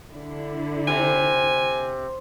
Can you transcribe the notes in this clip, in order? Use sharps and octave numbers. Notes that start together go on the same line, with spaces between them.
D3 E4
C3 G#5